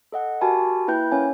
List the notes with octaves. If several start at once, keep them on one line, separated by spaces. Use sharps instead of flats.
A4 D#5 F#5
F#4 G4 A#4 G#5 A5 B5
A#3 E4 B4 G5 G6
C#4 A#4 C#5 F5 G#5